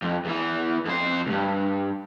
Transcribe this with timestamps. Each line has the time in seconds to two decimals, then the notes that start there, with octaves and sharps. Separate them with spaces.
0.02 F2
0.25 E2 E3
0.86 F2 C5
1.27 C2 G2